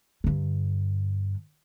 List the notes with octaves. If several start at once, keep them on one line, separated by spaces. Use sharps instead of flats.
G2 D3